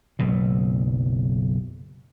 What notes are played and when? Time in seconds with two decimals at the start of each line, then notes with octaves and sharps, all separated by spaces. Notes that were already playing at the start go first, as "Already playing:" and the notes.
0.19 F#1 B1 B2